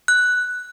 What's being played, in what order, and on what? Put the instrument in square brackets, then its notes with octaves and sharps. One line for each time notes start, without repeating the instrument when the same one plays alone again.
[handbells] F#6